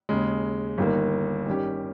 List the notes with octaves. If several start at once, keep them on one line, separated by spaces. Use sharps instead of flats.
D#2 C#3 G#3
G1 G2 D#3 A#3
D#3 G3 C#4 G4